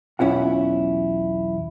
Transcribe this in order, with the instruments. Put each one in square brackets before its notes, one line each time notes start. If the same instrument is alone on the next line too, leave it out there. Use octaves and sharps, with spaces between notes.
[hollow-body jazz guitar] B1 E2 C#4 E4 F4 F#5